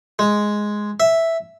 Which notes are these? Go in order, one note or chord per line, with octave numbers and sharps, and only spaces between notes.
G#3
E5